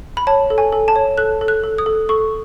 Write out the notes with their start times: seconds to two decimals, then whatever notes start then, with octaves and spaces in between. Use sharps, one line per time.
0.17 B5
0.27 C#5 A5
0.50 A4
0.58 G#5
0.73 A4
0.88 A5
0.96 C#5
1.18 A4 F#6
1.41 A4
1.48 F#6
1.64 A4
1.78 D#6
1.86 A4
2.09 A4 C#6